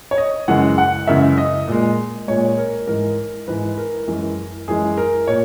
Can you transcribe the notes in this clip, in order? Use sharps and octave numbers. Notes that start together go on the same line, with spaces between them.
C#5
D#5
F#2 C#3 E3 G#3 F#5
F#5
F#2 C#3 E3 G#3 E5
D#5
A#2 G#3
A#2 G#3 C#5
A#4
G#2 E3 G#3 A#4
G#2 E3 G#3 B4
A#4
F#2 E3 G#3
F#2 E3 G#3 G#4
A#4
A#2 C#5